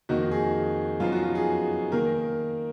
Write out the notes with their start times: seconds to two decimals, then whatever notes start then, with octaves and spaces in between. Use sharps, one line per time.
0.09 F2 D#3 A#3 D#4 F#4
0.31 G#4
1.00 F#2 F3 B3 D#4 F4
1.12 F#4
1.23 F4
1.35 G#4
1.92 D#3 A#3 A#4